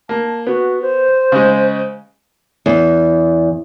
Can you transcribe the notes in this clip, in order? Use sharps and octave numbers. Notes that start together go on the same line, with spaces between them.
A#3 A5
B3 F#4
C5
C#3 G#3
E2